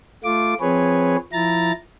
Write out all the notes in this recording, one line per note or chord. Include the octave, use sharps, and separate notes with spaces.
A3 F4 D6
F3 C4 G#4 B4 C#5
F3 E4 A#5 A6